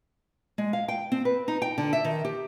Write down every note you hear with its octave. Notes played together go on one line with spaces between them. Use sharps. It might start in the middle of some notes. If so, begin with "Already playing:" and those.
G#3
F5
G5
C4
B4
D#4
G5
D3
E5
D#3
G4